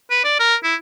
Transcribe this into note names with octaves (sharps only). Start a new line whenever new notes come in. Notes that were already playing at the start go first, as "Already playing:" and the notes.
B4
D5
A#4
E4